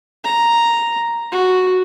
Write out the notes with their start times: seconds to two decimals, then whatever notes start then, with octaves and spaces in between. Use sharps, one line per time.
0.24 A#5
1.32 F#4